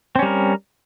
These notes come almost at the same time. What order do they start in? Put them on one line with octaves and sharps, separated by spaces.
C4 C#4 G3 A#4